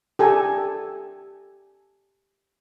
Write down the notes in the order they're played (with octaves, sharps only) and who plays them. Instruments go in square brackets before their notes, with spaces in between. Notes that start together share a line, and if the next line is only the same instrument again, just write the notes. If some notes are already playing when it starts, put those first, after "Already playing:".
[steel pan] G4 A4 G#5